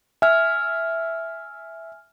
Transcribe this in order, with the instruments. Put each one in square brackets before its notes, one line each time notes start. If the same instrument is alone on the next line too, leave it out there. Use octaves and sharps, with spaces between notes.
[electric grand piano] E5 [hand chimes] G#5 F6